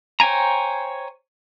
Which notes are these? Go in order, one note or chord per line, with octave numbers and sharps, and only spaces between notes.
C5 C#5 G5 G#5 A#5